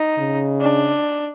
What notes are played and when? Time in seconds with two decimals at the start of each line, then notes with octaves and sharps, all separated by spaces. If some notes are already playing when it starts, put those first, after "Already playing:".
Already playing: D#4
0.18 C#3
0.61 D4